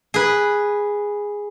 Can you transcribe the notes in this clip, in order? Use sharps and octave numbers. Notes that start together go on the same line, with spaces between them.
G#4 B4